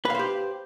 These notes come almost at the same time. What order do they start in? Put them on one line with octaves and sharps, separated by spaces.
B4 F5 C5 G4